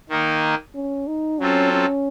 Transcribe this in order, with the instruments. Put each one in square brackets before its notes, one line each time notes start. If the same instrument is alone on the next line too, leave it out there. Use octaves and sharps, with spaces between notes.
[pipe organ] D#3 A#3 D#4
[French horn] C#4
D#4
[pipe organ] F#3 C4 F4 A4 [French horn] C#4
[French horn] C#4